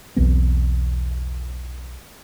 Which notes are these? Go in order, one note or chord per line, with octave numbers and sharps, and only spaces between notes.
B1 E2 B3 C4